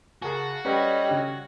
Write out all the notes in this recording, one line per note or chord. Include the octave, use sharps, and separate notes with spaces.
C#3 F#4 G#4 A#4 G#5 A5
G3 C#4 G4 A4 B4 C#5 D#5
C#3